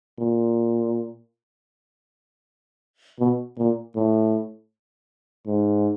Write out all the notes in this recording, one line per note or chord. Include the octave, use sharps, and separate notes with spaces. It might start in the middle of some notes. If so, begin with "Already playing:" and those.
A#2
B2
A#2
A2
G#2